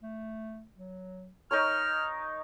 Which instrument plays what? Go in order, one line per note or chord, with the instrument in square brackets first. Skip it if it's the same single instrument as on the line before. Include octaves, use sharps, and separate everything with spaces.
[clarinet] A3
F#3
[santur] D#4 A#4 C#5 [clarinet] F6